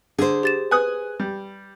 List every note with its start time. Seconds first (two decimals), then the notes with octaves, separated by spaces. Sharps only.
0.18 D3 G#4 C5
0.43 G4 A6 E7
0.71 B4 G#5 D#6 F#6
1.20 G3